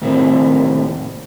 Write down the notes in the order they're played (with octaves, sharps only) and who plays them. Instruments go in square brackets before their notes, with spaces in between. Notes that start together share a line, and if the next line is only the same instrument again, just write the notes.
[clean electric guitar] D#2 A2 C3 C4